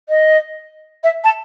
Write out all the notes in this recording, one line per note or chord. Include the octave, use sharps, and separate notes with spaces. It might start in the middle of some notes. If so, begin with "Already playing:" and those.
D#5
E5
A5